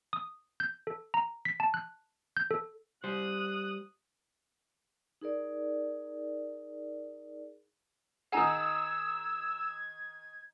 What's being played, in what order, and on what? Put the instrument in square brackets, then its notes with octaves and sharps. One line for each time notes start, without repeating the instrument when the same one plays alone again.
[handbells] D#6
G6
A4
A#5
B6
A5
F#6
G6
A4
[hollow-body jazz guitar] G3 C5 [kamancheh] D#6 F#6
[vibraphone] D#4 G#4 A#4 D5
[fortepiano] D#3 D#4 G#4 [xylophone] F#5 G#5 A#5 [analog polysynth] E6 [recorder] G#6